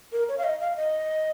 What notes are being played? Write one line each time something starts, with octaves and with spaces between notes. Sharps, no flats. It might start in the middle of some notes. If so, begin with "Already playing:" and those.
A#4
C#5
F5
D#5
F5
F5
D#5